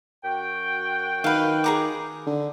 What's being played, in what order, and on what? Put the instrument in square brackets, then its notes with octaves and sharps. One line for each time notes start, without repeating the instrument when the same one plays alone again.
[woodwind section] F#2 F#4 G5
[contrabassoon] D#3 [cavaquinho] B4 F5
[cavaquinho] G#4 A#5 D6
[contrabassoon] D3